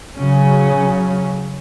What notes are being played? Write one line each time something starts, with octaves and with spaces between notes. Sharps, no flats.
C#3 F#3 C#4